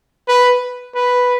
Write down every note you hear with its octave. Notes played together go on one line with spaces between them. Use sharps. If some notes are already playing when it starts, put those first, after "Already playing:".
B4
B4